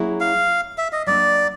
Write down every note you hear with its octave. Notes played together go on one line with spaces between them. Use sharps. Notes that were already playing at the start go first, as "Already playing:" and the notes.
Already playing: F#3 A#3 C#4 E4 G#4
F5
E5
D#5
F#3 A#3 D4 D5